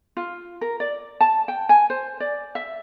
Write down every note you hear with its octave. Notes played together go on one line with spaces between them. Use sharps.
F4
A#4
D5
A5
G5
G#5
C5
D5
E5